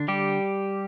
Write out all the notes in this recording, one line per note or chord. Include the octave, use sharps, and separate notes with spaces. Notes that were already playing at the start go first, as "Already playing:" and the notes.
Already playing: D3 D4
G3 G4